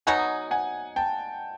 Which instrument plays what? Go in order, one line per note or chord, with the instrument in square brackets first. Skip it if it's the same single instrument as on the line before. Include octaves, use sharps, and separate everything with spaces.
[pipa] B2 F#3 B3 D#4 [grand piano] F#5 G#5
[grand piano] F#5 G#5
G5 A5